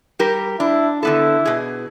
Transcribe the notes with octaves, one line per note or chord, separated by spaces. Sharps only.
G3 G4 A#4
D4 E4
D3 B3 E4 A4
B2 G#4